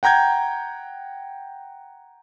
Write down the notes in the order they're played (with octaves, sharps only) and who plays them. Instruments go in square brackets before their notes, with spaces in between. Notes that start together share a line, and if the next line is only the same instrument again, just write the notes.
[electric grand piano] F#5 G5 A#5 G6 G#6